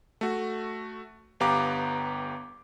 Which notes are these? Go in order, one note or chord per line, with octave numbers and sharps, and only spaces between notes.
A3 F#4
G1 B3 G4 F5 A#5 D6